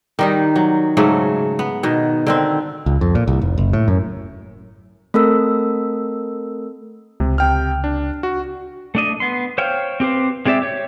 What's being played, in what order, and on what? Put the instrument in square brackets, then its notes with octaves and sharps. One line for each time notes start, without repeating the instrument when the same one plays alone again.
[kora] D#3 G3 D#4
F#3
G#2 C#3 F#3 A3
B3
B2 D#3
D3 D#3 C4
[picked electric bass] C#2
F2
A#2
C2
F1
F#1
A2
F#2
[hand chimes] A3 C4 A4 A#4 E6
[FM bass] C#2 [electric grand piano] C3
[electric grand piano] C3 G5 F6
D4
F#4
[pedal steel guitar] A3 D4 D#5
B3 C6
C5 C#5 F5 G5
C4 G4 B4 C5
G#3 C4 G4 D5 E5
G4 C#5